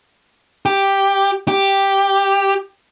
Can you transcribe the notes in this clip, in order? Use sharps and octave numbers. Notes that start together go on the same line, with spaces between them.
G4
G4